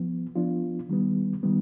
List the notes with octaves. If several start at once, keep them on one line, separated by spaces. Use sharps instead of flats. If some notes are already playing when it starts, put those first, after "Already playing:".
Already playing: F3 B3
F3 B3 D4 F4
D#3 G3 B3
D#3 G3 B3